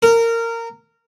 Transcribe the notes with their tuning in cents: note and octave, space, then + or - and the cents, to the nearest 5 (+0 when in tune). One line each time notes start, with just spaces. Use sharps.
A#4 -20